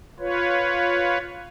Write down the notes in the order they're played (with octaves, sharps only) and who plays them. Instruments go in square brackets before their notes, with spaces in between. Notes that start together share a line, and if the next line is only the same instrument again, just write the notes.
[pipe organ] F4 B4 C#5